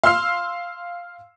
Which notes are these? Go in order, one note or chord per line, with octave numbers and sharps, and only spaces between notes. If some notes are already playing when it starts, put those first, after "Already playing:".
F5 C6 E6 F6 C7